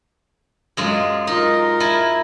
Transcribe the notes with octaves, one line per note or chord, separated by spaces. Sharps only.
F#2 G#3 F4
D#4 F4 A#4
E4 G#5 A5